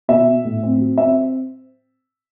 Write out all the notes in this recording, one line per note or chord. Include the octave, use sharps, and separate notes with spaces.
B2 E5
B3
A2
C4
F#3
C4 E5